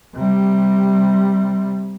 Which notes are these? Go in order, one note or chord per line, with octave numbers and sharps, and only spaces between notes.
C3 G3